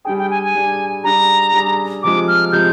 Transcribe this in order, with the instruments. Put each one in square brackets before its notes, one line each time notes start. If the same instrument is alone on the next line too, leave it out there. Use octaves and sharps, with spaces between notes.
[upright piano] G3 D4 G#4 [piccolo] G5
[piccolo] G5
G#5
G#5
[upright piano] G3 D4 G#4
[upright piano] G3 D4 G#4 [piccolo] A#5
[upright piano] G3 D4 G#4
[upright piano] C3 F3 G#3 [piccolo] D6
[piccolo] F6
[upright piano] C3 F3 G#3 [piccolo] G6